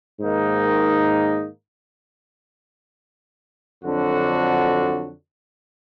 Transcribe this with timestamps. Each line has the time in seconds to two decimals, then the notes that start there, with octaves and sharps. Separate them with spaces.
0.20 G#2 D#3 A#3 D#4
3.84 F2 D3 F#3 D4 F#4